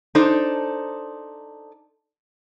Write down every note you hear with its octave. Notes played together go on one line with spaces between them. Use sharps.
D4 D#4 A4 C5